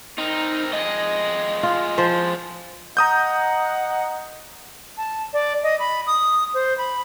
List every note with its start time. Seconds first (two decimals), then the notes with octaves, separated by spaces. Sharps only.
0.18 C4 D#4 A#4
0.73 F2 G#3 D#5
1.63 F4
1.98 F3 C5
2.97 D#5 F#5 A#5 D#6 G6
4.98 A5
5.33 D5
5.63 D#5
5.79 B5
6.07 D#6
6.54 C5
6.78 B5